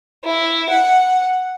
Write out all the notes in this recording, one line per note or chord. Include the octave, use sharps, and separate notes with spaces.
E4
F#5